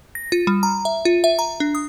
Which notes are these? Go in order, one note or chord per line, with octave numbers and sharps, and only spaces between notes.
A#6
F4
G3
A#5
E5
F4
E5
A#5
D4
D#6